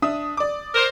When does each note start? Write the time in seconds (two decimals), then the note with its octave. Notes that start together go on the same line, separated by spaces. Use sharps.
0.02 D4 E5 D#6
0.37 D5 D6
0.75 A#4 C5